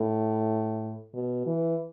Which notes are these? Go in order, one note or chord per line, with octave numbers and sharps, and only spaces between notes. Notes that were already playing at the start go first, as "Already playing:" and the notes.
Already playing: A2
B2
E3